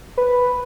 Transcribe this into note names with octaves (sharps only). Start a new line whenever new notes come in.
B4